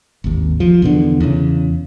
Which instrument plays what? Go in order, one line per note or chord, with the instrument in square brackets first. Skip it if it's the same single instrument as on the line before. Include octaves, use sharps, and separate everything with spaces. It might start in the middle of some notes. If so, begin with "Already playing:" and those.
[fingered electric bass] G#1 D#2
F3
E2 B2 D3
E2 C#3